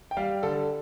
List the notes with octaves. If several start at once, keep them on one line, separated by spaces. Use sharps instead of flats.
G5
G3 F5
D3 A4